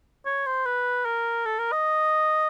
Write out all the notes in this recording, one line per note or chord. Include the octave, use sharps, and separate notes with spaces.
C#5
C5
B4
A#4
A4
A#4
D#5